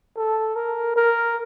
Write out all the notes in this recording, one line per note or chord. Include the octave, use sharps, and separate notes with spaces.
A4
A#4
A#4